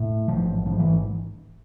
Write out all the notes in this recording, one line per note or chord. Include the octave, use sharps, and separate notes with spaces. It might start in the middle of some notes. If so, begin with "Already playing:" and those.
Already playing: A2
A1 G#2 F3
A1 G#2 F3
E3